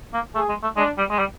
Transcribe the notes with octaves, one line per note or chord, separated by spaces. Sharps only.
A#3
A3 G#4
G#3
A3
G#3 D4
G3
G#3
G3